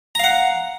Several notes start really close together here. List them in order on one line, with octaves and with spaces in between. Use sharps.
A#5 F5 F#5